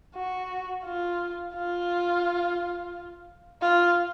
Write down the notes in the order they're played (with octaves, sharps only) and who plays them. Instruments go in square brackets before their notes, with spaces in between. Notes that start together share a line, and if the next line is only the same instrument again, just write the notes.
[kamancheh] F#4
F4
F4
F4